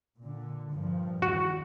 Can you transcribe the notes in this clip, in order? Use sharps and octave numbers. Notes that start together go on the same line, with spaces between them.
A#2 D3
G2 A#2 F3
E2 D#3 F#4